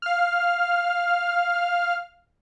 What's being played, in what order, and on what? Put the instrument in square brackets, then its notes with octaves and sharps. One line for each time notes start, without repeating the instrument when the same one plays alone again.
[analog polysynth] F5 F6